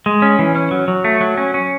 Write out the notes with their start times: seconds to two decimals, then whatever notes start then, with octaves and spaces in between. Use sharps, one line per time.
0.06 G#3
0.22 C#4
0.39 E3
0.55 C#4
0.71 F#3
0.88 F#3
1.04 A3
1.21 F#3
1.37 C#4
1.54 C#4